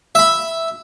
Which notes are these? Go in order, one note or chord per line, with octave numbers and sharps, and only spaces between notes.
E5 B5